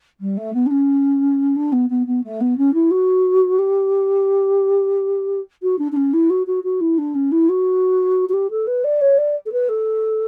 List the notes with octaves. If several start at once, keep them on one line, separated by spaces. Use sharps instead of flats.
G3
A3
B3
D4
C#4
D4
B3
B3
B3
A3
B3
C#4
E4
F#4
G4
F#4
D4
D4
C#4
E4
F#4
F#4
F#4
E4
D4
C#4
E4
F#4
F#4
G4
A4
B4
D5
C#5
D5
A4
B4
A4